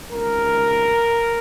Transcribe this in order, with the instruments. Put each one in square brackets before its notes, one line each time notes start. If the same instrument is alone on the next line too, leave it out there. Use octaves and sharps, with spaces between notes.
[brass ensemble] C#2 C3 D#3 A#4